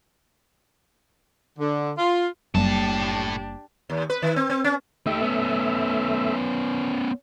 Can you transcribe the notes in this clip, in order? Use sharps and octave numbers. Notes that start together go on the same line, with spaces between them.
D3
F4
F#1 F#2 A2 G3 A#3 D4 G4 A5
D#2
B4
D#3
C4
C4
C#4
A3 D#4 G4 E5
B3 C#4